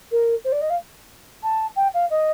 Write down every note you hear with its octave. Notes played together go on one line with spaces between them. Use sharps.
A#4
C5
D5
D#5
F5
A5
G5
F5
D#5